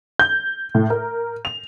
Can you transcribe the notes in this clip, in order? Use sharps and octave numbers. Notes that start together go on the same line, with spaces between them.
G6
A2
A#4
F7